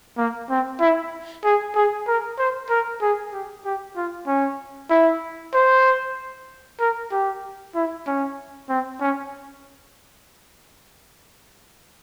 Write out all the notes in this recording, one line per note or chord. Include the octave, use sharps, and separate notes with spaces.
A#3
C4
E4
G#4
G#4
A#4
C5
A#4
G#4
G4
G4
F4
C#4
E4
C5
A#4
G4
E4
C#4
C4
C#4